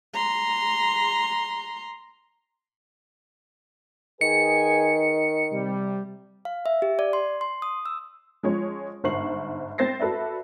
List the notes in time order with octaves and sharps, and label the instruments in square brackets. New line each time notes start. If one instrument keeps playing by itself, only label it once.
[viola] A#5 C6
[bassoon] D#3 [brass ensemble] G#4 B4 G#5 [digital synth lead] C#7
[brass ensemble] C3 G3
[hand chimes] F5
E5
G4
D5
C6
C6
D#6
E6
[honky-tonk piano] F3 G#3 C#4 C#5
G1 G#2 C5 C#6 C7 F#7
C4 C5 A6 A#6 C7
F#4 A4 B4 D5 E5